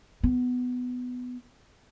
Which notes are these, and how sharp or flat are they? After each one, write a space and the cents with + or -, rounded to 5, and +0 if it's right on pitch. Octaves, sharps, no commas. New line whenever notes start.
B3 +10